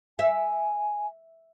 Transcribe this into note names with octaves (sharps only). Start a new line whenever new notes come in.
E5 G#5